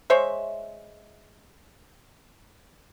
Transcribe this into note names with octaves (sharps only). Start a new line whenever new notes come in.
G#3 C5 C#5 E5